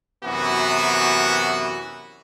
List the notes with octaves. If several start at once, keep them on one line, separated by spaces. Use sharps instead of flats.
F#2 C3 E3 B3 F#4